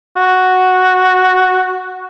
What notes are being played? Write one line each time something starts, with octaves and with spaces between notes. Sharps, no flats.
F#4